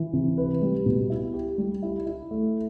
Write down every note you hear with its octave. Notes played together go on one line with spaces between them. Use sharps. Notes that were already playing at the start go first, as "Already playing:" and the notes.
Already playing: E3
C3
B4
G3
B2
E4
G4
G3
E4
E4
A3